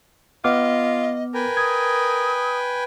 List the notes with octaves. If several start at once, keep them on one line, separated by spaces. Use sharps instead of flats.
B3 F4 D#5 D6 F6
A#4 B4 G5 G#5
D#6 G#6